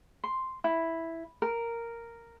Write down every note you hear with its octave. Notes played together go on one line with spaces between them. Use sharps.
C6
E4
A#4